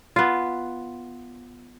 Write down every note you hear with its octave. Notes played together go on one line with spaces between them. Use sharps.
B3 F4